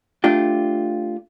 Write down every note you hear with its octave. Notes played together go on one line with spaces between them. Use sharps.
A3 D4 F4 G4